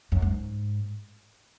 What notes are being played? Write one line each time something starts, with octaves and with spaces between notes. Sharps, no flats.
F#2
G#2